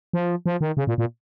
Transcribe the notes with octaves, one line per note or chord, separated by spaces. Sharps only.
F3
F3
D#3
C#3
A#2
A#2